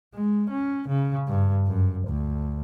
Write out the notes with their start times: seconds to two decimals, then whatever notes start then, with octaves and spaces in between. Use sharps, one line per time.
0.14 G#3
0.50 C#4
0.89 C#3
1.28 G2
1.67 F#2
2.08 D2